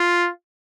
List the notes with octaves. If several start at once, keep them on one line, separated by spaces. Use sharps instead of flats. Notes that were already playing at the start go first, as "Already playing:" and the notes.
Already playing: F4